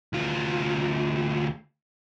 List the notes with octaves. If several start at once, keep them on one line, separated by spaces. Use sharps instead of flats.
D2 F4